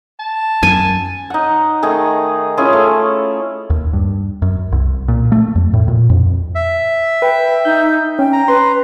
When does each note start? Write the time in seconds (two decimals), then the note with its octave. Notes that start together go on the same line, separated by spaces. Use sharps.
0.19 A5
0.63 F#2 G#5
1.30 D#4 F#5
1.83 D#3 A3 D#4 G#4
2.57 C#4 E4 F4 G#4
2.73 A3
3.70 D#2
3.93 G2
4.42 F#2
4.72 C2
5.08 A#2
5.32 A3
5.55 F2
5.74 A2
5.88 A#2
6.10 F2
6.55 E5
7.22 B4 G5
7.65 D#4 G6
8.19 C#4 G5
8.33 A#5
8.48 B4 C6